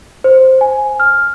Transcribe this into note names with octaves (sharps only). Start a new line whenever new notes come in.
C5
G#5
F6